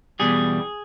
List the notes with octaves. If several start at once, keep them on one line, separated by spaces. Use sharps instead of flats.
E2 B2 G3 G#4